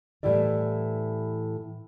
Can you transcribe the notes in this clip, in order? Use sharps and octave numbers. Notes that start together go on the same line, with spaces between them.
A2 E3 G3 E4 D5